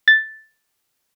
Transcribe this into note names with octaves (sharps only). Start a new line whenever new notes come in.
A6